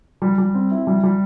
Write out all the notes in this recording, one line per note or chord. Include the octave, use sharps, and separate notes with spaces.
G3
G3
C4
E4
G3
G3